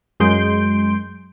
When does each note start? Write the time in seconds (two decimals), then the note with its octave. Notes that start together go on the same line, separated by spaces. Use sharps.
0.20 F#2 G#3 C6 G6 D7